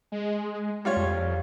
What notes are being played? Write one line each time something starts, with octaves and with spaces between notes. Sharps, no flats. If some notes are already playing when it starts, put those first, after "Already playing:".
G#3
G3 F4 C#5
F2